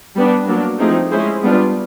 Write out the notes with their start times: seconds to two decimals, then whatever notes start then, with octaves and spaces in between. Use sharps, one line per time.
0.16 G3 B3 D4
0.47 F#3 A#3 D4
0.79 F3 A3 C4 D#4 G#4
1.11 G#3 C#4 E4 G#4 C5
1.43 G3 B3 D4 F4